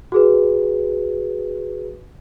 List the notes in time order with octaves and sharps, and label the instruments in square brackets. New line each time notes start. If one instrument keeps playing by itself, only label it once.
[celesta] F#4 G#4 B4